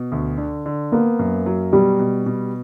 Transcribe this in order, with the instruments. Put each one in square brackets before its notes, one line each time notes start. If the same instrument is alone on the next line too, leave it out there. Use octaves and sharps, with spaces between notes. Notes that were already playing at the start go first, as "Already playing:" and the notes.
Already playing: [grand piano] B2
D2
D3
D3
[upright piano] A#3 [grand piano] B3
[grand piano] F#2
F#3
[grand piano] B2 [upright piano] G3
[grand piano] B2
B2